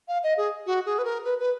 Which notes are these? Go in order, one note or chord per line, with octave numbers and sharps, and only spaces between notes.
F5
D#5
G#4
F#4
G#4
B4
A#4
B4
B4